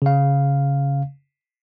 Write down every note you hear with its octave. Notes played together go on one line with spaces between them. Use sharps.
C#3 F5